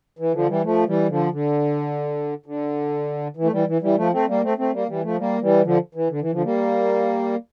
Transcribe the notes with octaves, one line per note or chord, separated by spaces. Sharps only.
E3
D3 F3
E3 G3
F3 A3
E3 G3
D3 F3
D3
D3
E3
A3
E3 G3
E3
E3 G3
F3 A3
A3 C4
G3 A#3
A3 C4
A3 C4
G3 A#3
E3 G3
F3 A3
G3 A#3
E3 G3
D3 F3
E3
D3
E3
D3 F3
G3 A#3